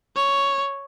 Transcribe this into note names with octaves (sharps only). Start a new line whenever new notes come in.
C#5